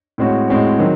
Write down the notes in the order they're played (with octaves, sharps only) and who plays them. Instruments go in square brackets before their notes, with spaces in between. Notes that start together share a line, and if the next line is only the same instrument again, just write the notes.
[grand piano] A2 G#3 C4 F#4 C#5
A2 G#3 C4 F#4 C#5
D#3 F#3 C4